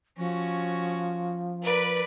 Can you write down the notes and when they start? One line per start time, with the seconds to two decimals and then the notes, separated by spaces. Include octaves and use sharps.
0.17 F3 C#4 F#4
1.64 A#4 B4 D5